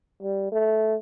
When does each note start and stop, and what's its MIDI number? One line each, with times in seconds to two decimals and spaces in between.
0.22 0.49 55
0.52 0.95 57